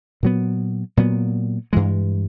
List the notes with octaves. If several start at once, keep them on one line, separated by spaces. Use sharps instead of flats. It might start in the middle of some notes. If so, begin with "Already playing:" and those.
A#2 F#3 B3
A#2 F#3 B3
G2 E3 G#3